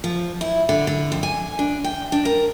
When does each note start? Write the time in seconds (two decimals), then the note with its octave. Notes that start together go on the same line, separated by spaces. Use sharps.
0.04 F3
0.41 E4
0.69 D3
0.87 D3
1.12 F2
1.23 G#5
1.59 D4
1.84 G5
2.12 D4
2.25 A#4